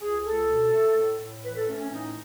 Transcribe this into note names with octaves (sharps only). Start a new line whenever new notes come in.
C#2 G#4
C#2 A4
B2
A3
A2
A2
E3 B4
A4
A3 C#4
C#4
A2 D#4